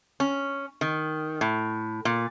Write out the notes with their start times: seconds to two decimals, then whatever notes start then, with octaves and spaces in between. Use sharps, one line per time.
0.20 C#4
0.81 D#3
1.41 A2
2.05 A#2